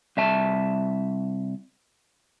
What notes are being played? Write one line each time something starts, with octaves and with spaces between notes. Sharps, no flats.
C2 E5 A5